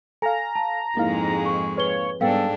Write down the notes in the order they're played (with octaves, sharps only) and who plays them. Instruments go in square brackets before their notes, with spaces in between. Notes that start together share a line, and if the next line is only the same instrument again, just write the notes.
[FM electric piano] A4 F5 [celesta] G#5 [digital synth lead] A#5
[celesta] A5
[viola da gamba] F2 G#2 G#3 [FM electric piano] A#3 D#4 F5 [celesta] E4
[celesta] C#6
[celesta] B4 G7 [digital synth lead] C#5
[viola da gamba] G#2 D4 [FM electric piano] G3 B3 [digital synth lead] A4 [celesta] F5 G5